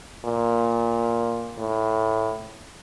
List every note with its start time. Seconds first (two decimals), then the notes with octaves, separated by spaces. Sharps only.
0.25 A#2
1.58 A2